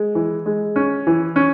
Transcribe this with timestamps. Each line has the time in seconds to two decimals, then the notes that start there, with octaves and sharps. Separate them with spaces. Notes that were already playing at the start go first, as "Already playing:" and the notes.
Already playing: G#3
0.15 E3
0.46 G#3
0.76 C#4
1.07 E3
1.36 C#4